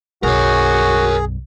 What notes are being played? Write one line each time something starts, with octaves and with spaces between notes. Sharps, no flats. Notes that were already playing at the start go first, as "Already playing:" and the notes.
B1 F#2 F#4 G#4 A#4 C#5